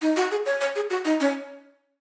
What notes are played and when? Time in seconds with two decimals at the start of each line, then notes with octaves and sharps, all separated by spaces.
0.02 D#4
0.16 F#4
0.31 G#4
0.46 C#5
0.61 C#5
0.76 G#4
0.90 F#4
1.05 D#4
1.20 C#4